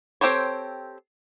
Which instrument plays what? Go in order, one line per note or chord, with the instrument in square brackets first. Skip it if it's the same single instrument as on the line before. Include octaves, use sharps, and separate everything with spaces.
[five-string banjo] C4 G4 A4 C5 C#5